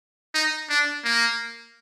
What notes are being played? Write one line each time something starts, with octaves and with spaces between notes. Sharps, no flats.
D#4
D4
A#3